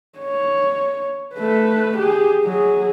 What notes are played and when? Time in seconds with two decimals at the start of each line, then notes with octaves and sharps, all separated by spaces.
0.19 C#5
1.35 A3 B4
1.96 G4 G#4
2.44 F#3 G#4